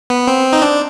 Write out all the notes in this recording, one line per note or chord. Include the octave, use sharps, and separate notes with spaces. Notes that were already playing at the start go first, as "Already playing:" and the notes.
B3
C4
D#4
D4